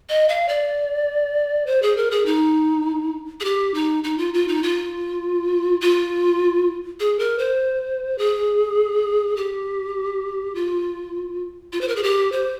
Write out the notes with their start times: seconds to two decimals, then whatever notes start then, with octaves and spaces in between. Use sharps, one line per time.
0.09 D#5
0.29 F5
0.49 D5
1.67 C5
1.82 G#4
1.97 A#4
2.11 G#4
2.26 D#4
3.40 G#4
3.45 G4
3.74 D#4
4.04 D#4
4.18 F4
4.34 F4
4.48 D#4
4.63 F4
5.81 F4
7.00 G#4
7.19 A#4
7.39 C5
8.18 G#4
9.37 G4
10.55 F4
11.73 F4
11.81 C5
11.88 A#4
11.96 G#4
12.03 G4
12.32 C5